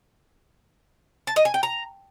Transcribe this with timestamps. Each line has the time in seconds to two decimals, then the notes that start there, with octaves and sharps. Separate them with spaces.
1.27 A5
1.36 D#5
1.45 G#5
1.54 G5
1.63 A#5